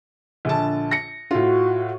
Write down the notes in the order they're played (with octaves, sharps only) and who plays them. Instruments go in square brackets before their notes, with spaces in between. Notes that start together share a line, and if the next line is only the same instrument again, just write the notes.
[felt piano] A#1 D3 A5
A#6 C#7
[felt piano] A2 F4 [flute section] F#4